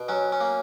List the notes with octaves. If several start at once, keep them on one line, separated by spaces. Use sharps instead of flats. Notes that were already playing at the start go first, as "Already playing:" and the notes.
Already playing: B2
F#3 C#4
C#4
A#3